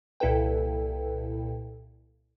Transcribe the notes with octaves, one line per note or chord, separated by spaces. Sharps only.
C2 A#2 E4 A4 B4 G5